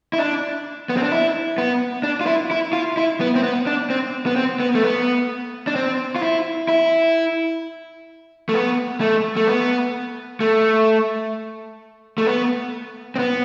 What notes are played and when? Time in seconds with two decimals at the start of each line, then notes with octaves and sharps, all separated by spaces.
0.13 E4
0.19 D4
0.89 B3
0.97 C4
1.03 D4
1.11 E4
1.58 B3
2.03 D4
2.21 F4
2.26 E4
2.51 E4
2.73 F4
2.97 E4
3.20 B3
3.36 C4
3.43 B3
3.67 D4
3.90 C4
4.26 B3
4.36 C4
4.60 B3
4.75 A3
4.83 B3
5.67 D4
5.76 C4
6.16 F4
6.23 E4
6.69 E4
8.49 A3
8.54 B3
9.01 A3
9.37 A3
9.48 B3
10.41 A3
12.18 A3
12.27 B3
13.16 C4
13.19 B3